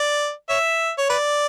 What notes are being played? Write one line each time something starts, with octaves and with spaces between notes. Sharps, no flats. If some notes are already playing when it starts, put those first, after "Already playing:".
Already playing: D5
C#5 E5
C#5
B4 D5